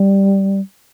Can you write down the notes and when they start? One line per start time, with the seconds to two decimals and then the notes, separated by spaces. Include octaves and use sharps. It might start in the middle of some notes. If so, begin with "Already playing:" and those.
Already playing: G3